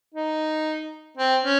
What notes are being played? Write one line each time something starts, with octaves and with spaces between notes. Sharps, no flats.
D#4
C4
C#4